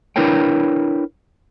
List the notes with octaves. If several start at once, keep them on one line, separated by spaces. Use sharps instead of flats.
D4 E4 A#4 B4 C#5 G5